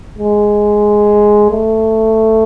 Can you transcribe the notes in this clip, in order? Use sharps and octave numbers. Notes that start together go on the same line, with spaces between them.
G#3
A3